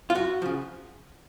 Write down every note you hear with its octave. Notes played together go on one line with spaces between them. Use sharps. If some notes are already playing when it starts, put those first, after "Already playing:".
F4
F#2 F#4
C#3 F3